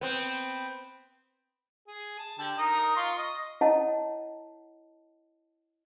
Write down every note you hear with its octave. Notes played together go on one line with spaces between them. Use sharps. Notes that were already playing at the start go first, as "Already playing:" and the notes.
B3 C4
G#4
A5
D3 G4 A5
D#4 A#4 D#5
F4 C6 C#6
D#5
E4 C#5 D#5 F#5 A5